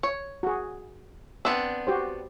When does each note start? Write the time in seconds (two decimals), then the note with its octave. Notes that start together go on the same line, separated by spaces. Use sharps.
0.03 C#5
0.43 F#4 G#4
1.45 B3 C4 D4 E6
1.87 F#4 G4 C5